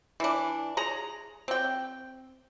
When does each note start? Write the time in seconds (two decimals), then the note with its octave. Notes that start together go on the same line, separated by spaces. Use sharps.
0.20 E3 D4
0.77 G#4 A#5
1.48 C4 G5